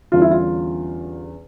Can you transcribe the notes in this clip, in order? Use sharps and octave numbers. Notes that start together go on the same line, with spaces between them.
E2 D3 G3 C#4 F4
E4
F4